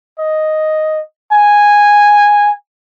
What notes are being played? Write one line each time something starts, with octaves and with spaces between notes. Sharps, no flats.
D#5
G#5